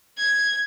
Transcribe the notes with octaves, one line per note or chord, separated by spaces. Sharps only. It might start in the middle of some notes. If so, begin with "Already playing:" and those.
G#6